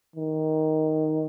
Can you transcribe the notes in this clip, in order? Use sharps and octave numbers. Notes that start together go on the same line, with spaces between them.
D#3